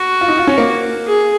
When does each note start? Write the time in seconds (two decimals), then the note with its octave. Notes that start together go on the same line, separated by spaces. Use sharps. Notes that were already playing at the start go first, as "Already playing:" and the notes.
Already playing: F#4
0.21 F4
0.28 D#4
0.38 F4
0.47 C#4
0.58 A#3
1.07 G#4